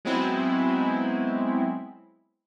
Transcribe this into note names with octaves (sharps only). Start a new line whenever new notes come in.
F#3 G#3 B3 C4 E4